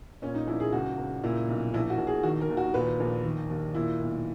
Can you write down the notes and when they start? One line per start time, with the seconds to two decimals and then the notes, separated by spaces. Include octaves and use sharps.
0.22 A#2 C#4
0.35 D#4
0.47 A#1 E4
0.60 G#4
0.72 C#2 F#4
0.98 C#2
1.24 A#2 E4
1.48 B1
1.74 A#1 E4
1.90 F#4
1.98 A#1
2.07 G#4
2.24 D#3 F#4
2.41 A#4
2.49 D#2
2.57 F#4
2.74 A#2 B4
3.00 A#1
3.24 D#3
3.49 D#2
3.74 A#2 E4
4.00 B1